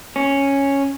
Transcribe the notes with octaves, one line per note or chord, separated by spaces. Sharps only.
C#4